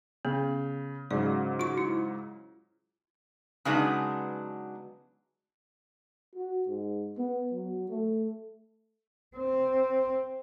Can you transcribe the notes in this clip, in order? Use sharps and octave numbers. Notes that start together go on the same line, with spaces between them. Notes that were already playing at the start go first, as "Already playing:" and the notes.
C#3 B3
G#2 C#3 F#3 D5
F4 F#4 C#6
E4
C#3 F#3 G#3 B3 D4 D#4
F#4
G#2
B3
F#3
A3
C4